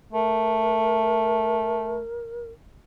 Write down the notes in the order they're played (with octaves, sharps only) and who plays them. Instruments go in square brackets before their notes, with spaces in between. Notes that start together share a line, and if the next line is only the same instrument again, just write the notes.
[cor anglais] A3 [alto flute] A#4